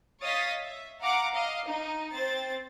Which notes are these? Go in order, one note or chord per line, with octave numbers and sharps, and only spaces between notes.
C#5 D#5 F5 D#6 A6 B6
E5
F5 F#5 A#5 D6
D#5 F5
D#4
C4 C5 A6